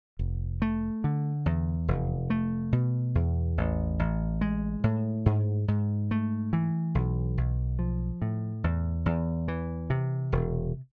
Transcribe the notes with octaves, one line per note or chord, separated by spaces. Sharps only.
F1
A3
D3
E2
F1
A3
B2
E2
A1
A1
G#3
A2
G#2
G#2
A3
E3
B1
B1
F3
A2
E2
E2
E3
C3
E1